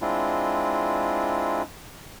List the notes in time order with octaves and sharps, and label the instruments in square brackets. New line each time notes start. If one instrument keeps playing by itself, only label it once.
[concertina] G#3 C4 D4 E4 F4